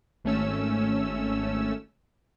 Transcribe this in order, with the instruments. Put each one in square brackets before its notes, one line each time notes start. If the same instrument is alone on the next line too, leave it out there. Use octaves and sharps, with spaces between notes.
[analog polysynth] G#1 A3 C#4 E6